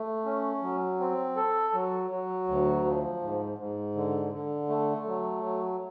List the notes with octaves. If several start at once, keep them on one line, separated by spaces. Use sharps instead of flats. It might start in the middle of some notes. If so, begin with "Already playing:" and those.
Already playing: A3
C#4
F#3
C4
A4
F#3
F#3
D2
F3
G#2
G#2
D3
D3
A3
F#3
F#3